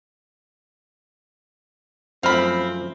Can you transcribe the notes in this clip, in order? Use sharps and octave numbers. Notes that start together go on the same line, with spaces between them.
F#2 F3 A3 C4 F5 B5